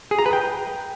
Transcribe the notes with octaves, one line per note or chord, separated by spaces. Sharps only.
G#4
A#5
B4
G5